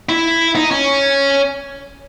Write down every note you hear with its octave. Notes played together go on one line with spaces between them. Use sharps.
E4
D#4
C#4